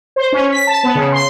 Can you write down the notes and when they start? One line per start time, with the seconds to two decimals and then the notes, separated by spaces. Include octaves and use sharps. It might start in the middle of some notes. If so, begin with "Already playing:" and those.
0.16 C5
0.32 C#4
0.52 B6
0.67 A5
0.83 B3
0.95 C#3
1.12 C6